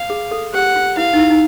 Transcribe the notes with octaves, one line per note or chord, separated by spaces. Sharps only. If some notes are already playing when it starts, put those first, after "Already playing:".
Already playing: F5
G#4
A4
G4 F#5
F4
E4 F5
D#4
E4
D#4